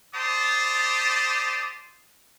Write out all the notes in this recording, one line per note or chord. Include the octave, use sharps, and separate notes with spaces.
G4 C5 D5 A5 D#6